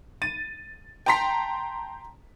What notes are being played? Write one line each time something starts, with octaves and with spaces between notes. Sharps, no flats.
A6 D#7
G5 A5 A#5 C6 B6